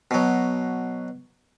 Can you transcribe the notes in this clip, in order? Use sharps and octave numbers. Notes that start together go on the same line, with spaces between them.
B2 F#3